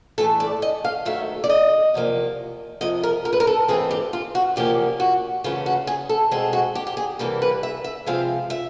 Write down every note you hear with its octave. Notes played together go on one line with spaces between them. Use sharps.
A2 E3 A3 A4
D5
D#5
F5
G#2 D#3 F#3 A3 E5
D5
D#5
E2 C3 F3 A#3
F2 C3 F3 D#5
A#4
A#4
B4
A#4
A4
G#2 E3 A3 C4 G#4
G4
F4
F#4
E2 C3 F3 A#3 C#4 G4
F#4
C#3 E3 A3 C#4 F4
F#4
G#4
A4
B2 G#3 C4 G#4
F#4
G4
G4
G#4
E2 C3 E3 G3 A#3 A4
B4
E5
E5
C3 F3 G#3 C4 F5
E5